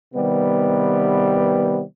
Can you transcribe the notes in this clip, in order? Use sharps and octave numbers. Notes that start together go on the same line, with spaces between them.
C3 D#3 G3 B3